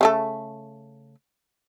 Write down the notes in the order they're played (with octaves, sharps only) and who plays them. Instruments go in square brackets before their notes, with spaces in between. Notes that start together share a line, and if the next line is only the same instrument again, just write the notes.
[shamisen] C#3 A3 A4